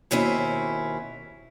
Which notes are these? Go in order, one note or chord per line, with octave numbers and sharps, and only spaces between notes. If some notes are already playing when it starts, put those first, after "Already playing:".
D#2 B2 C4 C#4 E4